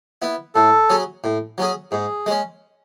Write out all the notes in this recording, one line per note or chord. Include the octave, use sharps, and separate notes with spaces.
B3 E4
A2 A4
F#3 C#4 G#4
A2
F#3 C#4 G#4
G#2 G#4
G#3 C#4